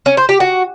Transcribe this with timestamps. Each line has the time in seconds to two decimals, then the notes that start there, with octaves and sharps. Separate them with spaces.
0.06 C#4
0.17 C5
0.29 G4
0.40 F#4